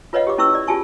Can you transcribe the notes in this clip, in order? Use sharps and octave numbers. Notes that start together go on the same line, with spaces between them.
F4 B4 C#5 D#5 F5 F#5
G4 D6
C#4 E4 B4 C#6 E6
D5
F4 G4 G#4 G#5 A5 C#6